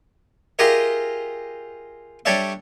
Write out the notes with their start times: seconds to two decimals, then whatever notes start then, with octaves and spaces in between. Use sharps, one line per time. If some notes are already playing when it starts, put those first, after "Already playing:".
0.59 F4 G4 G#4 A#4 D#5 E5
2.25 G3 D4 A4 C#5 D5 E5